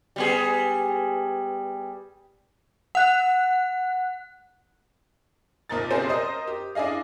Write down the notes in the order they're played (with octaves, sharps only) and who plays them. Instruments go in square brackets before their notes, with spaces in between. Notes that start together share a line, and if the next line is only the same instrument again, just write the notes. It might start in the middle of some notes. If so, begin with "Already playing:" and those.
[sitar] G3 B3 G#4
[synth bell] F#5 F#6
[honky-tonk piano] F1 A#2 F3 D#4 A#4 A6
F#1 B1 C4 G4 G#4 C5
A#4 C5 D#5 D#6
G4
D4 E4 G#4 D#5 F5